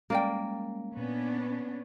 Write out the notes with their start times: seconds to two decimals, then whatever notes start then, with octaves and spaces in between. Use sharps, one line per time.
0.10 G3 G#3 A#3 C#4 A#4 D5 G5
0.97 A#2 B3 C#4 D4